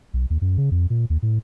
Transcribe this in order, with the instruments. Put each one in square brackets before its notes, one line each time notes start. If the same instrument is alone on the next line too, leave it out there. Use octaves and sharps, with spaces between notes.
[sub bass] B1
D#2
F#2
C#3
F2
A#2
D#2
A2